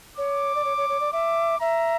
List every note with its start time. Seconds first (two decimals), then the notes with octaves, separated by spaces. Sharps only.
0.17 C#5 D6
0.55 D5
0.65 C#5
0.77 C#5
0.89 C#5
1.00 D5
1.13 E5 D6
1.60 E5 A#5